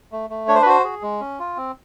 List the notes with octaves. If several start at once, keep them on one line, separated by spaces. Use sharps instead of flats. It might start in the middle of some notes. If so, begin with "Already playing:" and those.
A3
A3
D4 C#5
C5
B4
F#4 C5
G#4
G#3
C#4
F4
C4